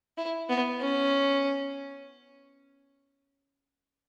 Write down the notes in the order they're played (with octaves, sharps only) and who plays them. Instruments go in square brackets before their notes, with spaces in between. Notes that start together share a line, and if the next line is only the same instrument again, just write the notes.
[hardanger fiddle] E4
B3
C#4